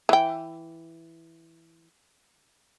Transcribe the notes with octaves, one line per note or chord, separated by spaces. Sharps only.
E3 G5